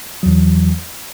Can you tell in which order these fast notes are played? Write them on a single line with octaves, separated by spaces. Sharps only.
F#3 E2 E3